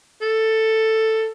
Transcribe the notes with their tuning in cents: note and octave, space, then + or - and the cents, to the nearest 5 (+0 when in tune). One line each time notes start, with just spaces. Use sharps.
A4 +10